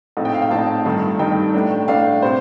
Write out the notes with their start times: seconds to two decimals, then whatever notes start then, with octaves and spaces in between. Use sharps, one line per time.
0.17 A#1 A2 A3 C4 D#4
0.25 G5
0.34 F5
0.42 G5
0.50 A#1 A2 A3 C4 D#4 A5
0.85 G2 D#3 A3 D#4
1.19 G2 D#3 A3 D#4 G5
1.54 A2 A3 D4
1.88 A2 A3 D4 F5
2.22 C3 C5